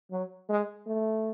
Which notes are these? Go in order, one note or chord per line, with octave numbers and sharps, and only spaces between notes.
F#3
G#3
A3